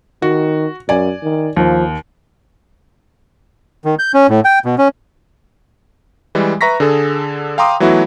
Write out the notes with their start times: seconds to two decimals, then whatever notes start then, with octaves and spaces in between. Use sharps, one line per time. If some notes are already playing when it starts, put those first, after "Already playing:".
0.22 D#3 F#4
0.89 F#2 D5 G#5
1.23 D#3
1.56 D#2 F3
3.85 D#3
3.99 G6
4.14 C#4
4.29 A2
4.45 G5
4.65 B2
4.78 C#4
6.35 E3 G3 G#3
6.61 B4 E5 A#5 C#6 A#6 B6
6.80 D3 G#4 A4
7.58 F5 G5 A#5 C6 D6 D#6
7.80 E3 F#3 A3 B3 E4 F#4